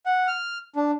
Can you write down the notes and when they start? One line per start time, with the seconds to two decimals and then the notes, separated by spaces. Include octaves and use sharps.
0.06 F#5
0.27 F6
0.76 D4